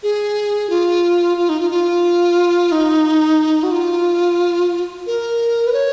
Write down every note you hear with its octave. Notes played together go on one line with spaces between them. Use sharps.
G#4
F4
F4
D#4
F4
F4
D#4
F#4
F4
A#4
B4
C#5